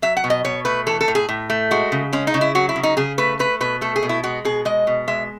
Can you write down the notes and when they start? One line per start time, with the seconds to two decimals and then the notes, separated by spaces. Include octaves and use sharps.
0.02 F#3 E5
0.17 F#5
0.24 B2
0.30 D#5
0.44 B2 C#5
0.65 A3 B4
0.87 E3 A4
1.01 A4
1.08 A2
1.15 G#4
1.29 A2
1.50 A3
1.71 G#3 F#4
1.92 C#3
2.13 G#3 C#4
2.27 D#4
2.34 C#3
2.41 E4
2.55 F#3 F#4
2.69 E4
2.76 C#3
2.83 D#4
2.97 C#3 G#4
3.18 A3 B4
3.39 A3 B4
3.61 B2 B4
3.81 A3 A4
3.96 G#4
4.03 B2
4.09 E4
4.23 G#3 F#4
4.45 B2 G#4
4.65 G#3 D#5
4.87 B2
5.08 G#3 E5